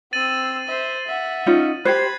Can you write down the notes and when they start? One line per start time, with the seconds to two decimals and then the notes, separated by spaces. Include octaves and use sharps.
0.13 C4 E6 A6 D#7 F#7
0.67 C5 E5
1.07 E5 F#5
1.46 C#4 D#4 F4
1.85 G4 C5 B5 F#6 G#6 C7